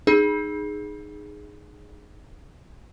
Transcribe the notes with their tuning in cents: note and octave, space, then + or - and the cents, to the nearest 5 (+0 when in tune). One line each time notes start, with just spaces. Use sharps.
D#4 -20 G#4 +0